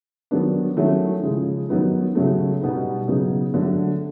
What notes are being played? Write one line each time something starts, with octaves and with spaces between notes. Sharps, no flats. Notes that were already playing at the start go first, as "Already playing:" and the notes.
D#3 F#3 B3 D4
D#3 F#3 A3 C#4 E4
C#3 F3 G#3
D#3 F#3 B3 D#4
C#3 F#3 A3
B2 G3 B3 D#4
C#3 F#3 B3 D#4
D3 F#3 A3